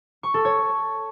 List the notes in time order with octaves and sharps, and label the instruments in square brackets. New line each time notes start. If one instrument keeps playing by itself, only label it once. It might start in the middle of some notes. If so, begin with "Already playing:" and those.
[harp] C#6
A4
C#5